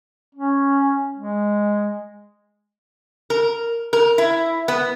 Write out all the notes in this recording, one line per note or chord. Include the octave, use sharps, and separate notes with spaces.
C#4
G#3
A#4
A#4
E4
B3